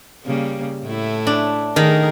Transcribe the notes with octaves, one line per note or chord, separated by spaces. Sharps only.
C#3 G3 A#3
A2 A3 E4
D4
D#3 A3 G#4 A#4